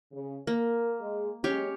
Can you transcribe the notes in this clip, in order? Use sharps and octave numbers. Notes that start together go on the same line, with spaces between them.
C#3
A#3 A#4
G#3
F#3 G#3 C#4 G4 C#5 F5